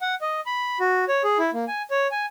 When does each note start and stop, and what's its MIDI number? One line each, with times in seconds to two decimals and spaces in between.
0.01 0.15 78
0.21 0.40 75
0.46 0.78 83
0.80 1.05 66
1.09 1.22 73
1.24 1.38 68
1.39 1.50 64
1.54 1.65 58
1.68 1.82 80
1.91 2.07 73
2.11 2.26 80